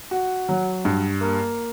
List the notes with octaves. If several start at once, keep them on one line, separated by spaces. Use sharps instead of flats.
F#4
F#3
G2
A#3